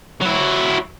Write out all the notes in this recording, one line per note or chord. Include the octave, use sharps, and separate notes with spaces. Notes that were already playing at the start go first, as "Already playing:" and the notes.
F#3 E4